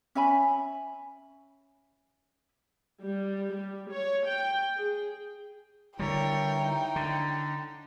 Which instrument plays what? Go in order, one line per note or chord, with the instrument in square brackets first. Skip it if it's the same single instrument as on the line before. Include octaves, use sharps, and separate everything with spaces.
[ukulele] C#4 E5 G#5 B5
[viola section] G3
G3
C#5
G5
G#4
[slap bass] D3 G3 [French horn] E4 [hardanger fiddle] A#4 C#5 [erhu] G5
[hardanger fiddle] D#4
[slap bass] D3